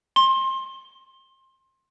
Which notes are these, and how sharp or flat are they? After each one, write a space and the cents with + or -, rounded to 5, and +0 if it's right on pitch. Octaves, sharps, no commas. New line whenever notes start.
C6 +25